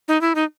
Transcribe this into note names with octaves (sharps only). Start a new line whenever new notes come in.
D#4
E4
D#4